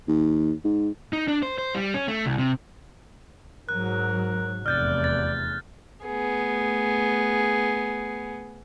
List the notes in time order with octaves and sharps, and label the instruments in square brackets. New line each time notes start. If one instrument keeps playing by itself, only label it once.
[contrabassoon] D#2
G#2
[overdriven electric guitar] D#4
D4
C5
C5
G3
C#4
A3
C2
C3
[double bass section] G#2 F#3 [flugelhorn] A#4 [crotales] F#6
[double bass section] F1 E2 [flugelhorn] D5 [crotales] F6 G6 A6
[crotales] A6
[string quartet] A3 B3 G#4